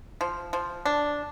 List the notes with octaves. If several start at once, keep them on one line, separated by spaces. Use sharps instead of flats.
F3
F3
D4